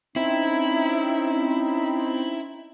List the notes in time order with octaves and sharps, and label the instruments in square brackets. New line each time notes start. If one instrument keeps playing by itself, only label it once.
[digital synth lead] C4 [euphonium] C#4 [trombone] D#4 [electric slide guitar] E4